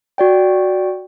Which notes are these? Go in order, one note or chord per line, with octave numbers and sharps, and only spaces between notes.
F#4 D5 G5